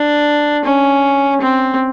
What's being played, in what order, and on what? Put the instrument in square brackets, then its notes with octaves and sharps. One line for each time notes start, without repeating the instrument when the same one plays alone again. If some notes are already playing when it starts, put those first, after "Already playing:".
Already playing: [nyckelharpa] D4
C#4
C4